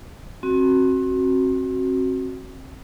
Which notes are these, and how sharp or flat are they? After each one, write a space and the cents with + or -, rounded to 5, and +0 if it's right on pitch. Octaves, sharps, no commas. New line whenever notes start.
C4 +35 F#4 +5